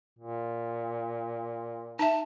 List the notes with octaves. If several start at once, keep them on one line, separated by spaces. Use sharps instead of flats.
A#2
D#4 E5 A5